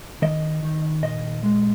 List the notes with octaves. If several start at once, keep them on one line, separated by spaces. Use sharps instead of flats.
D#3 D#5
D#3
A#2 D#5
G#3